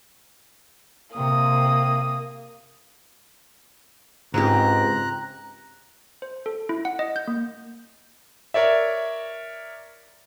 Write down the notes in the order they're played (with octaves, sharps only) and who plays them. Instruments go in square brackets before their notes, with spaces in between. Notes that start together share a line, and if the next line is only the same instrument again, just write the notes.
[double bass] C3 [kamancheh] A#3 D#6
[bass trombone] C#2 [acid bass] G#2 [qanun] C4 G4 [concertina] A#5 F#6
[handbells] C5
A4
E4
F#5
D#5
G6
A#3
[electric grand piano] A#4 C#5 D5 E5